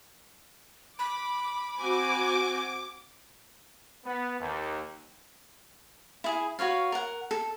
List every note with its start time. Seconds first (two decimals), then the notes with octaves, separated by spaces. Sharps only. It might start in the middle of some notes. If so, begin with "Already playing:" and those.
0.99 B5 D6
1.78 C4 F#4 G#5 D6
4.05 B3
4.39 D#2
6.24 E4 G#4
6.59 F#4 B4 C#5 F5
6.92 A#4 F#5
7.31 A4